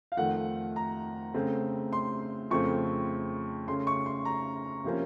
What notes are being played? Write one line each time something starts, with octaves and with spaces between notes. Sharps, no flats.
F5
F2 D#3 A3 F#5
A#5
C#3 A3 C4
C6
F2 C#3 A3 C4 C#6
C#3 A3 C#4 C6
C#6
C6
A#5
C3 F3 A#3 C#4